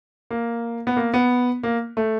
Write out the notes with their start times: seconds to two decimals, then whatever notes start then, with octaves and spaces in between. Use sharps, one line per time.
0.31 A#3
0.87 B3
0.96 A#3
1.14 B3
1.63 A#3
1.97 A3